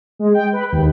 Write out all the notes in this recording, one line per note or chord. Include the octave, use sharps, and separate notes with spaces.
G#3
G5
B4
D#2